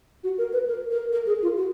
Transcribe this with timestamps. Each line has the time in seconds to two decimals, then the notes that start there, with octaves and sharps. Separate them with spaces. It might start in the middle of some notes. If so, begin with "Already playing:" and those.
0.24 F#4
0.38 A#4
0.53 B4
0.67 A#4
0.91 A#4
1.12 A#4
1.26 G#4
1.42 F4
1.57 F#4